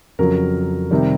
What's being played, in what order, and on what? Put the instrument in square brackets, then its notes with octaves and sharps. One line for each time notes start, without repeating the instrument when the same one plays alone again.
[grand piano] F2 C#3 F#3 A#4
C3 D#3 G3